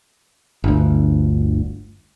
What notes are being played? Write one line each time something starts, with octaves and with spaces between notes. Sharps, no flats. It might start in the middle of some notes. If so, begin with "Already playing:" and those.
G1 D2